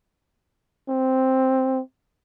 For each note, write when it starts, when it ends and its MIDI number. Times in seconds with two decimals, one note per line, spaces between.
0.89 1.82 60